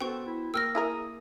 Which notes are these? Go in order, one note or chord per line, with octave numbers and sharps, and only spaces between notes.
B3 F#4 A4 C5 G5 C#6
E4
A#3 G5 E6 F6 A#6
E4 G#4 A#4 D#6